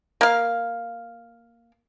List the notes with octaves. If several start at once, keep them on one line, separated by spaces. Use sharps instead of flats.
A#3 F5